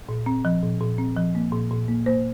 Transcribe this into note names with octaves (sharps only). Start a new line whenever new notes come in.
A#2
C4
F3
A#2
A#2
C4
F3
A#3
A#2
A#2
A#3
A#3 C5